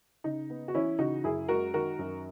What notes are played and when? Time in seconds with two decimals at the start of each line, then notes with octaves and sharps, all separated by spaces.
0.24 C#3 D#4
0.50 B3
0.68 F#4
0.74 E3 C#4 E4
0.99 C#3 D#4 F#4
1.24 F#2 E4 G#4
1.48 G#3 F#4 A#4
1.74 D#3 F#4 A#4
1.99 F#2